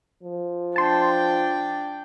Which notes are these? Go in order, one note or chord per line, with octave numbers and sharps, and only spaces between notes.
F3
D4 G5 A5 C6